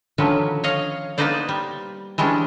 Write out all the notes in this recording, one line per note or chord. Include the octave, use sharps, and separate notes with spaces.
D3 D#3 F3 F#3 C#4 B4
C#5 D#5 F5
A#3 B3 D#4 B4 C5 D5
G3
E3 G3 G#3 C#4 D4